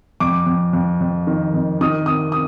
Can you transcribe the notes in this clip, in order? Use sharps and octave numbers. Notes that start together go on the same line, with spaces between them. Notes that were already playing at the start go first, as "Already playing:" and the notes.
F2 D6
F2
F2
F2
D#3
F2
D#3 D#6
D#3 D#6
D#6